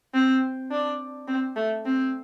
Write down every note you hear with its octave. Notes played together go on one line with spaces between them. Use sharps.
C4
D4
C4
A3
C4